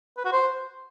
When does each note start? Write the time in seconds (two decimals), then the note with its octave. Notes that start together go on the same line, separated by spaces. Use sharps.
0.18 B4
0.25 F#4
0.32 C5